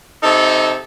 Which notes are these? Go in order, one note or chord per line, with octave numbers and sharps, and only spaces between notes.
C3 D#4 A4